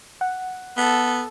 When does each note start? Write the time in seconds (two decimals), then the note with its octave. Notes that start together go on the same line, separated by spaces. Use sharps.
0.21 F#5
0.77 B3 A4